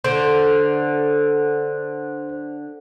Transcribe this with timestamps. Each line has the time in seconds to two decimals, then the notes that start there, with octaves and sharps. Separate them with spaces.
0.04 D3 C5